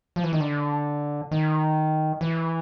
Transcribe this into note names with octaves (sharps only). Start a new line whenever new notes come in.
F3
E3
D#3
D3
D#3
E3